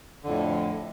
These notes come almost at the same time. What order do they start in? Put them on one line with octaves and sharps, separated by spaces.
D3 F2 A2